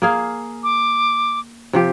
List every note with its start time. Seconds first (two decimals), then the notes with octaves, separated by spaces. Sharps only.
0.02 A#3 G#4 F5
0.63 D6
1.73 C3 F3 G4